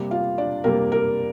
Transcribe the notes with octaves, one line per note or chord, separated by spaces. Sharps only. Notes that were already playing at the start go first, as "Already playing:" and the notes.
Already playing: C3 G3 A#3
F4 F5
D4 D5
C3 G3 A#3 A#4
A#4